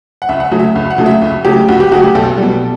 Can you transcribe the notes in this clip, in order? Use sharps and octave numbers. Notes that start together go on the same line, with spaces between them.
F#5
C#2 E5
F#5
E5
C#3 F#3 A3
E5
C#2
F#5
C#3 F#3 A3
E5
C#2
C#3 F#3 A3 G4
C#2 F#4
G4
C#3 F#3 A3 F#4
G4
B1 A4
B2 G3